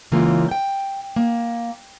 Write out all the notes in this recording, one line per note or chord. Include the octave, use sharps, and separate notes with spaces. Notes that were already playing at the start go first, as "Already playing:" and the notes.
C#3 E3 G#3 A#3 F4
G5
A#3